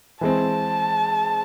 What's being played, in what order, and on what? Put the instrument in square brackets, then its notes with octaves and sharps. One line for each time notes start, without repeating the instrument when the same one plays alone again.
[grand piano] E3 G#3 C4 [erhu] A5